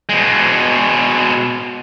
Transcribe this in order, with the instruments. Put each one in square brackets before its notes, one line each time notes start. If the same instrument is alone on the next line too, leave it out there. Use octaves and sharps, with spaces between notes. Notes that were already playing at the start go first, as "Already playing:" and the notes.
[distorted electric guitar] B2 G#3